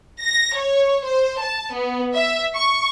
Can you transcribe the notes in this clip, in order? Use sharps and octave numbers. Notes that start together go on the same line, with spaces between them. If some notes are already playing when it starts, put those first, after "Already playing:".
A#6
C#5
C5
A5
B3
E5
C#6